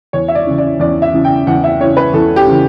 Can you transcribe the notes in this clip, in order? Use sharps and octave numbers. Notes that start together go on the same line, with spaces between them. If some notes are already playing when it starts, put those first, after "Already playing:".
E2 C#5
E5
D5
C#3 E3
D5
E2 D5
E5
C#3 E3
G5
E2 F#5
E5
C#3 E3 C#5
B4
E2 A4
G4
C#3 E3